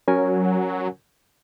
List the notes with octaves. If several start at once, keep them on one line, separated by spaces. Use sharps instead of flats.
F#3 C#4 A#4 G#5